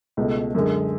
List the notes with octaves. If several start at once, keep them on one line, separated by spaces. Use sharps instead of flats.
C#2 B2 A3
F#2 D3 G#3